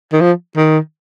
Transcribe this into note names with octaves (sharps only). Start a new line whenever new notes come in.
D#3
F3
D#3